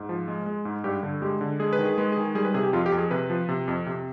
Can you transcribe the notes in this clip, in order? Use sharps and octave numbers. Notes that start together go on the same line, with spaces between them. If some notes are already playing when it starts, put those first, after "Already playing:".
Already playing: G#2
F3
G#3
G#3
G#2
G2 G4
D3
G#3 G4
D3
G#3 G#4
B4
D#3
G#4
G#3 B4
G#4
D#3
G3 G#4
B4
C3 G#4
G4
F2 F4
G4
F2
G#4
C3 B4
F3
C3
F2
C3